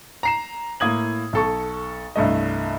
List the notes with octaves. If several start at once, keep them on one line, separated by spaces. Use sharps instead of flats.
A#5 C7 E7
A2 A#3 D#6 G#6 F#7
B1 A4 C#6
C2 G2 A3 D#5